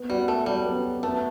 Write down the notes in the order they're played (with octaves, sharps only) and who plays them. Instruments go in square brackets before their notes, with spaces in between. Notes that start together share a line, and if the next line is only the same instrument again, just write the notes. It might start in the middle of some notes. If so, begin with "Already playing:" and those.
Already playing: [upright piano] B3
[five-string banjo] G3 [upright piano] F#4
[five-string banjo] A3 [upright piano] A4
[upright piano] F#3 [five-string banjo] G3
[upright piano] B3
F#4
[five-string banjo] A3 [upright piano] B3